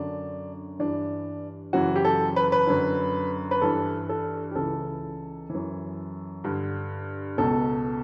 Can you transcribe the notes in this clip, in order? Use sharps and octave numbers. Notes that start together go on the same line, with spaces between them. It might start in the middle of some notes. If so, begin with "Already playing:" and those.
Already playing: F#2 D3 D4
G2 E3 D4
F#2 C#3 E3 F#4
G4
A4
B4
B4
F#2 D3
B4
G2 E3 A4
A4
G4
C#2 C#3 E3 A4
F#2 E3
G2 D3
C#2 B2 A4